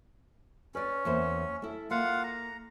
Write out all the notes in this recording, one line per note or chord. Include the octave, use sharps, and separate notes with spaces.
C#4 B4 D5
E2 A#3 C5
A3 E4
A#3 F4 F5 F#5
A#5